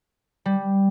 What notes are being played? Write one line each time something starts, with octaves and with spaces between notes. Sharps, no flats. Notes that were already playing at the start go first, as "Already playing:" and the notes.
G3